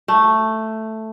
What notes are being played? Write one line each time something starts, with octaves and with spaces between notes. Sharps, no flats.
A3